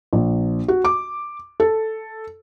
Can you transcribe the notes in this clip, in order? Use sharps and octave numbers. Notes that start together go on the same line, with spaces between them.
A#1
F#4
D6
A4